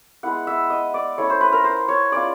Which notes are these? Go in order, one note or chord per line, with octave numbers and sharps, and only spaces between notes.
G#3 B3 E4 F#5
E5
D#5
D5
A3 C#4 E4 C#5
C5
B4
A#4
C5
C#5
G#3 C#4 F4 D5